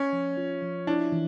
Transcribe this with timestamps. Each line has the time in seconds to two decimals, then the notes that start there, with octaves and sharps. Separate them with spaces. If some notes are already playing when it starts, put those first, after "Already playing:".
Already playing: C#4
0.13 F3
0.37 F4
0.62 F3
0.87 D4 E4
1.12 E3